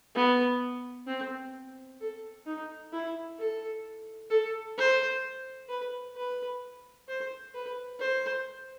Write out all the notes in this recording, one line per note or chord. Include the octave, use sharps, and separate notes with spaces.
B3
C4
A4
D#4
E4
A4
A4
C5
B4
B4
C5
B4
C5